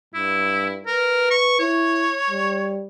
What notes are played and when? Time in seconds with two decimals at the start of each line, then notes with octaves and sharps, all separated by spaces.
0.14 G2 E4
0.86 A#4 B4
1.31 C#6
1.59 E4 C#5
2.30 G3